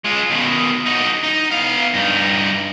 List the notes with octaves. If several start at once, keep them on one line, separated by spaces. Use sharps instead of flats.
G#3 F4
B2 D#3
D#4 F#4
D#4
B3 F5
G2 D#4